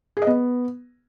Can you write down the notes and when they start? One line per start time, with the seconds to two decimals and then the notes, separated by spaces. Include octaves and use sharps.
0.17 G#4
0.22 D#5
0.27 B3